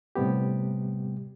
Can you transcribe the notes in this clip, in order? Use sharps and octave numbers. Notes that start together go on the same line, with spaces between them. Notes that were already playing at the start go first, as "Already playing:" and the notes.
A2 C3 G3 B3 G4